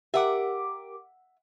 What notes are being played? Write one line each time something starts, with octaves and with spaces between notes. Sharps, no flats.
G4 A#4 E5 F#5 D6